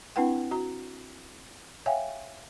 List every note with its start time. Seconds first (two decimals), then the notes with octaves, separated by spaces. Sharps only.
0.16 C4 D4 E4 B4 F#5 G5
0.51 F#4 A#5
1.86 C#5 E5 F5 G5 G#5